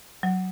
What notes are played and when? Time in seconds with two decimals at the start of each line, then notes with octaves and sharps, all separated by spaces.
0.23 F#3